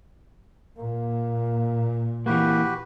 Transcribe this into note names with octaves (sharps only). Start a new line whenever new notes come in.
A#2 A#3
E3 A#3 F#4 G4 B4